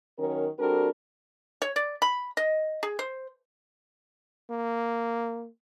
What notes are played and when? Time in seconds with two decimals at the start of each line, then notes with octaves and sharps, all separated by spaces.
0.18 D#3 F#3 C#4 A#4
0.58 G3 C4 D4 F#4 A4 A#4
1.62 C#5
1.76 D5
2.02 B5
2.37 D#5
2.83 G#4
2.99 C5
4.50 A#3